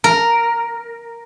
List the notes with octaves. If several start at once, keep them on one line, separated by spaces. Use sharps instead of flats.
A#4